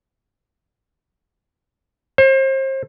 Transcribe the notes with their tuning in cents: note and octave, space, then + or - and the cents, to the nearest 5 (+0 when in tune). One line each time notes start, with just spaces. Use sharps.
C5 +35